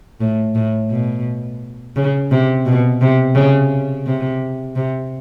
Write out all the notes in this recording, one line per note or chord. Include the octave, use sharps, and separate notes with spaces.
A2
A2
B2
C#3
C3
B2
C3
C#3
C3
C3